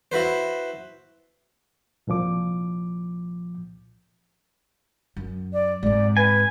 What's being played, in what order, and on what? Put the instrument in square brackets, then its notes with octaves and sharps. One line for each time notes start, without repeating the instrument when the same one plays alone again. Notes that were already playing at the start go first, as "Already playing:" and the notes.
[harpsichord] E4 F#4 B4 C5
[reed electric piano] C2 A#2 F3 D6
[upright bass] F#2
[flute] D5
[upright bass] G#2 C3 [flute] D5
[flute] B4 [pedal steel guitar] G#5